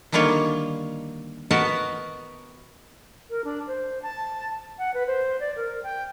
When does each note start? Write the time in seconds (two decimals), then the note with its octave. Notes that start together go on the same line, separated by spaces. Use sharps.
0.12 D3 D#3 G3 A#3 F4 C#5
1.51 B3 F#4 A#4 B4 D#5 A5
3.30 A#4
3.45 D4
3.67 C5
4.02 A5
4.78 F#5
4.94 B4
5.07 C5
5.40 D5
5.56 A#4
5.83 G5